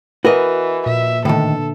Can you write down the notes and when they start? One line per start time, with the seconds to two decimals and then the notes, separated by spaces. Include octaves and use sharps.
0.25 E3 F#4 A#4 B4 D#5
0.86 A#2 E5
1.25 A2 D3 D#3 A4